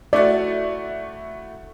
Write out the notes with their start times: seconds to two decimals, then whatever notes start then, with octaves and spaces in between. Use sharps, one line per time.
0.13 A3 E4 F#4 D5